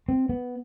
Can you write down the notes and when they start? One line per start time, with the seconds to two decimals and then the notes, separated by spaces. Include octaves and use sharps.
0.09 C4
0.29 B3